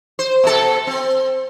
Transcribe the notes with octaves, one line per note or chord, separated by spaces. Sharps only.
C5
B2 A4
C4